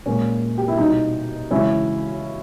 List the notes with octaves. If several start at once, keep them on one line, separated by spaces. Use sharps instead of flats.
A#2 G#3 C#4
G4
E4
B2 G3 D#4
C#3 E3 G#3 C#4 E4